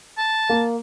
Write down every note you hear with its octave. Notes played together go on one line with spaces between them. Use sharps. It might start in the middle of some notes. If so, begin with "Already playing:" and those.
A5
A#3